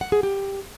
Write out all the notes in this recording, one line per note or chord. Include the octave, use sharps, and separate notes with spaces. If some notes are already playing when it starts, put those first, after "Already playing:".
F#5
G#4
G4